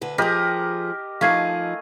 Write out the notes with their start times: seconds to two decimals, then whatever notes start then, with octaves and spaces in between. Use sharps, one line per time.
0.01 D2 D3 B4
0.18 F3 G4 G#4 A#4 D#5
1.21 F3 A3 D#4 A#4 F5 G#5 G#6 C7